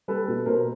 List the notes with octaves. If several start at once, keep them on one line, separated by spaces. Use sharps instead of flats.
G3 A4 B4
B2
B2 A#4 C5